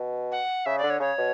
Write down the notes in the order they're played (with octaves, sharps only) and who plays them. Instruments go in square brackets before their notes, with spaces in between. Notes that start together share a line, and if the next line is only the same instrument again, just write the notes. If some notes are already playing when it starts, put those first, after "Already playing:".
Already playing: [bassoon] B2
[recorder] F#5
[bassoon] C#3 [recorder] E5
[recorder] D5
[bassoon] D3
[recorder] C#5
[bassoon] C#3 [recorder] C#5
[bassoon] B2